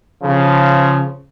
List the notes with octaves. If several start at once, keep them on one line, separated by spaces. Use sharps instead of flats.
C#3 F3